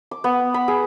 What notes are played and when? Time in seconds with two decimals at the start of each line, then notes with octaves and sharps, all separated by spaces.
0.11 D6
0.24 B3
0.54 B5
0.68 G#4